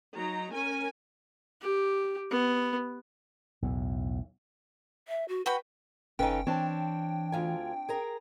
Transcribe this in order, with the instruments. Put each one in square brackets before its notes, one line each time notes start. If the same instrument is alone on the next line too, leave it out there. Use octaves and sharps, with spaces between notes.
[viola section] F#3 D#4 A#5
C#4 A#4 G#5
[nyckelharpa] G4
B3
[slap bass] B1 E2 A2
[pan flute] E5
F#4
[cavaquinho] F#4 G5 B5 [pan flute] B4
[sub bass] F#1 [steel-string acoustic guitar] C#3 D#4 [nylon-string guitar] C#4 A4 B4 [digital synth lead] G5
[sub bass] E3 [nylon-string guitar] C4 D4 A5 [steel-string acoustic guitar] C#5
[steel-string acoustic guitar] D2 F4 G#5
G#4 A#4 A#5